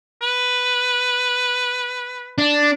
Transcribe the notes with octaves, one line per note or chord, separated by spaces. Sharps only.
B4
D4